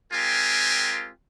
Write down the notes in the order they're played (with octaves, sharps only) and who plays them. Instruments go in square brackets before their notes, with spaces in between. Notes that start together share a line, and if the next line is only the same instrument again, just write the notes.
[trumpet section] G#3 C4 F4 G4 A#4 G#5